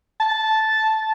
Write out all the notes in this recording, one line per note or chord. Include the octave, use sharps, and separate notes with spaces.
A5